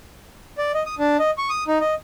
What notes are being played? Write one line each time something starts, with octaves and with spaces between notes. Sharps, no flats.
D5
D#5
D#6
D4
D#5
C#6
D#6
D#4
D#5